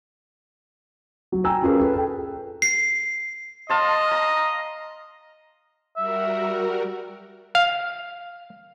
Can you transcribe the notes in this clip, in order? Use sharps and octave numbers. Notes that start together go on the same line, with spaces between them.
F#3
G5 G#5 A#5 E6
C#4 F4 G#4 A#4 B4
A4 B4
A4 G5
C7
D#5 F5 A5 C6
A#5
G3 F#4 A#4 E5
F5